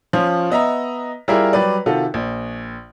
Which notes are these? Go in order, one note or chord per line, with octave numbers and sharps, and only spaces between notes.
F3 C#4 F4
B3 D#5 E5 A#5
G3 E4 F4 G#4 A#4 E5
F#3 G3 B4 D5
C3 D#3 F4 F#4 A4
A#1